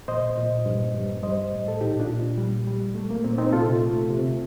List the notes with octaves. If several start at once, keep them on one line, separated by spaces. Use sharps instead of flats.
A#2 C5 D#5
A#2
G2
G2
G3 C5 D#5
A2
A4
A#2 D#4 G4
D4 F4
A#2
G3
G3
A3
A#3
A#2 C4
C4 D#4
C3 F4 A4
A3
C3